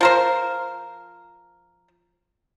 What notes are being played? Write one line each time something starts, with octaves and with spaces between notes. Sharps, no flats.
F3 A#4 C5